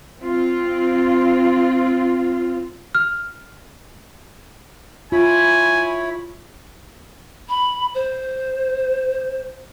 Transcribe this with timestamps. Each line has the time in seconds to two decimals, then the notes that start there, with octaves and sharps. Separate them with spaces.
0.18 C4 F4
2.95 F6
5.12 E4 F4 C#5 G#5 B5
7.49 B5
7.95 C5